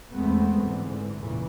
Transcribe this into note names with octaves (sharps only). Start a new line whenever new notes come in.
E2 G#3 A3 B3 C4
G#2 D3 E3
E2 A#2 C#3 E3